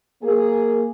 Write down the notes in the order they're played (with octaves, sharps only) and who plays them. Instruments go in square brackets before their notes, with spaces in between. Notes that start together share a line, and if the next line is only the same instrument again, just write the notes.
[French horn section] A#3 G#4